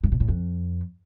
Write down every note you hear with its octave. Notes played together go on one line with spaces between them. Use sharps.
G2
A#2
A2
F2